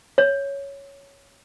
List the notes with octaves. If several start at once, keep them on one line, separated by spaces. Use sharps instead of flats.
C#5